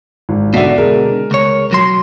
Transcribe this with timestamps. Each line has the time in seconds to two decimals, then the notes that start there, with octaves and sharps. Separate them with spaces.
0.29 G#1
0.54 B2 D3 F#4 D5 E5
0.78 G#3 A#4
1.31 C#2 C#5
1.71 B1 F#3 C6